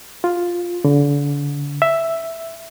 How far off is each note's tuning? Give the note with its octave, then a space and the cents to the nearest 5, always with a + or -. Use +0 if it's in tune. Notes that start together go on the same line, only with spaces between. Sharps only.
F4 +5
D3 -35
E5 +5